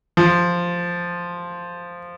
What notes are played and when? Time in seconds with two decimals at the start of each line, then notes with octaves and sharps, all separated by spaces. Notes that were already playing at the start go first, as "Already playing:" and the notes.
0.17 F3